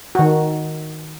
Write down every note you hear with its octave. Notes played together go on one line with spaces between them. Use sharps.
D#3 F#4